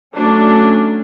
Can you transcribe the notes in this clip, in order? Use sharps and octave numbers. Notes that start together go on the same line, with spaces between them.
F#3 A3 C#4 D4